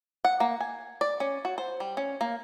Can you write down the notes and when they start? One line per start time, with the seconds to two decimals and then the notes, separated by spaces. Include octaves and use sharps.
0.25 F#5
0.40 A#3
0.60 G#5
1.01 D5
1.20 C#4
1.45 F#4
1.58 C5
1.80 G3
1.97 C#4
2.21 A#3